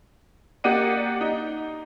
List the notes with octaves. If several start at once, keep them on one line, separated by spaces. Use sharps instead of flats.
A#3 G4 D5 D#5 F#5 D#7
D#4